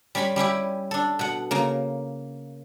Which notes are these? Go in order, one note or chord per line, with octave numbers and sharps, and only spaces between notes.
G3 C#4 C#5 B5 C6
G3 C#4 E4 G4
D4 A4
B2 F#5
C#3 A#3